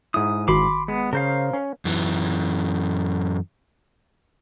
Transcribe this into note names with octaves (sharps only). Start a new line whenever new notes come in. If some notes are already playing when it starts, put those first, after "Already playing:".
G#2 E4 D#6
G1 D#3 F#4 B5 C6 D6
G#3 B3
C#3 A#4 C5 F5
C#4
F#2 E3